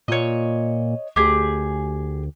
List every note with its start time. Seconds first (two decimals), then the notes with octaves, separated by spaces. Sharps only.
0.08 A#2 C#5 D#5
1.16 D2 G4 G#4